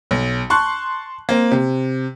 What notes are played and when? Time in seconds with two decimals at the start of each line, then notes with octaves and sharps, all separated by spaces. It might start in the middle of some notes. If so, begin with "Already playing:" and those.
0.11 B1
0.50 A5 C6 C#6 F#6
1.29 A#3 C4
1.51 C3